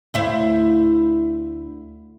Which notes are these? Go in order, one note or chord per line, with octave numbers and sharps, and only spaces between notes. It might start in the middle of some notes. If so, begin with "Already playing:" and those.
D2 E4 C5